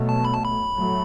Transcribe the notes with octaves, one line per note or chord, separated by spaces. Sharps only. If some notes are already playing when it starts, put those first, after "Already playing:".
Already playing: B2 F#3 A3
A5
B5
A5
B5
A2 F#3 A3